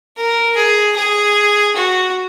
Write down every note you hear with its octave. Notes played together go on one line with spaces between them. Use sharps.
A#4
G#4
G#4
F#4